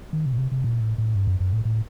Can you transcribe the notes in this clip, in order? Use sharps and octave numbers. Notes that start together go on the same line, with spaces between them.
D#3
C3
A#2
C3
C3
A#2
A2
A2
G2
F#2
F#2
A2
A2